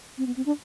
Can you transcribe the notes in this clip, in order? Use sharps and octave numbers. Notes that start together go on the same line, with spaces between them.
C4
B3
C4
D4